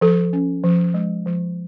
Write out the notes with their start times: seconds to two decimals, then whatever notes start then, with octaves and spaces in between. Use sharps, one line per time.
0.01 F3 A4
0.33 C#4
0.64 F3
0.94 G#3
1.26 F3